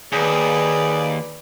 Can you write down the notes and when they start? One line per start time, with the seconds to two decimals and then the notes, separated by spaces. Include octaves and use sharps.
0.13 D#2 G#4 B4 D5